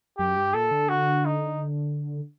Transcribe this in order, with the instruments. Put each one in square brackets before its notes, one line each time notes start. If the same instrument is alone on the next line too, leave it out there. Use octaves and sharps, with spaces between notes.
[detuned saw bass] F#2 [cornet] G4
[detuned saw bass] G2
[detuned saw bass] A#2 [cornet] A4
[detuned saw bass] D3
[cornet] F#4
D#4